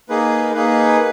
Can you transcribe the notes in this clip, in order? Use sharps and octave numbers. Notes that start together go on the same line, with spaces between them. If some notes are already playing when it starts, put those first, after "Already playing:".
A#3 D#4 G#4 B4
A#3 D#4 G#4 B4